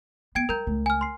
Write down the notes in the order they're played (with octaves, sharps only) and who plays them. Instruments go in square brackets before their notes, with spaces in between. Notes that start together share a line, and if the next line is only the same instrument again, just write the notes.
[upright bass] B3 [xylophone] G5 G#6 D7
[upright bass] G3 [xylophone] A#4 A#5 G6
[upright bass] C#2 A3
[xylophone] G#5 F6
C6 C7